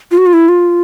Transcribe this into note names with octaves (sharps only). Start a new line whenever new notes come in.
F4
F#4
F4
E4
F4